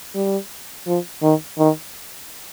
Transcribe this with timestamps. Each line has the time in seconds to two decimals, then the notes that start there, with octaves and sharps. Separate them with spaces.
0.15 G3
0.87 F3
1.22 D#3
1.59 D#3